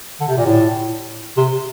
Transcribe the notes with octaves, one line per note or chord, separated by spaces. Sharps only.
D3
C3
A#2
A2
C3